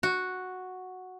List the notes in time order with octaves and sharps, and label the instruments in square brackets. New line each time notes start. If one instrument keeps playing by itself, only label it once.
[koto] F#4